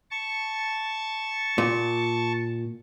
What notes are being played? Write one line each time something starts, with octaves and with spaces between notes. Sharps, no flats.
A5 C#6
A#2